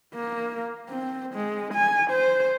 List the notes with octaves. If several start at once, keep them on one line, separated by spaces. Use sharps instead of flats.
A#3
C4
G#3
G#5
C5